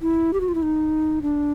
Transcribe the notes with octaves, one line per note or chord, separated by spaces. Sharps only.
E4
G4
F#4
F4
E4
D#4
D4